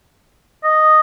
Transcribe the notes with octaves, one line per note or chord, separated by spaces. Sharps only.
D#5